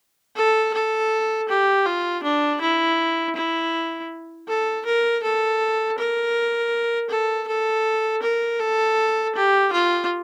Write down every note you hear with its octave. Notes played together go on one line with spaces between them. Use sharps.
A4
A4
G4
F4
D4
E4
E4
A4
A#4
A4
A#4
A4
A4
A#4
A4
G4
F4